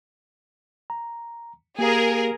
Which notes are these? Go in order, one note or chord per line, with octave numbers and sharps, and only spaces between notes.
A#5
A#3 G4 G#4 A#4 F5